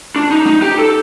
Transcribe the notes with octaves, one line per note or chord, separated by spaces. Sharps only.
D4
D#4
D#4
G4
A4